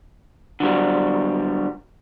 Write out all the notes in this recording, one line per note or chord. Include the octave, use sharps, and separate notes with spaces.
D3 F#3 G3